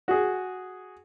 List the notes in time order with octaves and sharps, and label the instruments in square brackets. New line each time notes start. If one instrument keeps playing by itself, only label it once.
[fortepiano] F#4 G#4